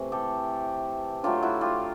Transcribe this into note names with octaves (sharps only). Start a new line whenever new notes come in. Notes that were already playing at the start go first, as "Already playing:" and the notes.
Already playing: C3 E3 A3
G4 A4
D3 F#3 A3 F4 G4
E4 F#4
F4 G4